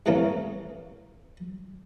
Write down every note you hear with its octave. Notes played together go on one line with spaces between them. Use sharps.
G#2 C3 E3 A3 A#3 C#4